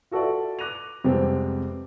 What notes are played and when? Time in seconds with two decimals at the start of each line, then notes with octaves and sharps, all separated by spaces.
0.11 F4 F#4 A4 B4 D5 E5
0.59 D6 F#6 A#6 D#7 F7
1.04 F2 C3 G3 G#3 B3 C4